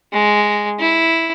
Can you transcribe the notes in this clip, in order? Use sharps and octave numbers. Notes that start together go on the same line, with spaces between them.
G#3
E4